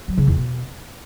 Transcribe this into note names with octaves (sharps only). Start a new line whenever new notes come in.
F#3
C#3
E2
B2